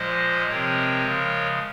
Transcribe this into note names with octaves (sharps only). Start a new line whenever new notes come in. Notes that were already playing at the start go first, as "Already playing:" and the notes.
Already playing: A#2 F3 G#3 C5 D#5
C3 F3 G#3 C4 A#4 C#5
C#3 F3 G#3